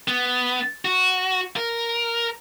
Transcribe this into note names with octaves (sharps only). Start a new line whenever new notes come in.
B3
F#4
A#4